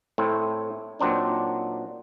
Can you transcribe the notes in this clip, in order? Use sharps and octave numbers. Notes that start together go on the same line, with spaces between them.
A2 A3 C4 E4
A#2 F#3 C4 D4 D#4